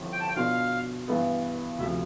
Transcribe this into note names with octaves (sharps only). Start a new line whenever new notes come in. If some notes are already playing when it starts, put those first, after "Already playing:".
Already playing: G1 G2 F3 C4 E4
G5
A5
G5
B2 B3 D4 F4 F5
G2 E3 B3
D2 C3 F3 E5